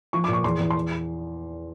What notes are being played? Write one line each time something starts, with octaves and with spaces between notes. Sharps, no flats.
F3 C#6
D6
A#2
C#6
E2 C6
E2
C6